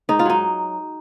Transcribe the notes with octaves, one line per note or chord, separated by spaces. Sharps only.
G#2 D#4
F4
F#3 D#4